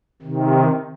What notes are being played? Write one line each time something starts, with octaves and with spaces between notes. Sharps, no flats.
C3 D#3